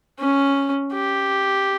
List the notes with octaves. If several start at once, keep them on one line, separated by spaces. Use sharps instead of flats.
C#4
G4